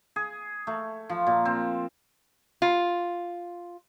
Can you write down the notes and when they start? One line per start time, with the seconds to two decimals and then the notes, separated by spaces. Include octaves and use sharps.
0.16 G#4
0.67 A3
1.09 F3
1.27 A#2
1.45 C4
2.62 F4